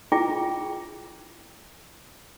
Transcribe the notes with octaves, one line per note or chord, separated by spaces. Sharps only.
E4 F4 G#4 G5 D6